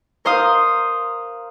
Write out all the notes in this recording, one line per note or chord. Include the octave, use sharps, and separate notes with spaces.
A#4 C5 F5 D#6